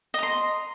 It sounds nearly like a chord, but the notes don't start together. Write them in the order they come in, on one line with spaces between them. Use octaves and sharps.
D#5 A#5 C6